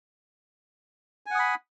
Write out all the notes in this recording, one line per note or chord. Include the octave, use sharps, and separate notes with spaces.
F#5 G#5 B5 D#6